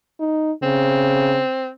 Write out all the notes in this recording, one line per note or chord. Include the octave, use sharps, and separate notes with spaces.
D#4
C#3 C4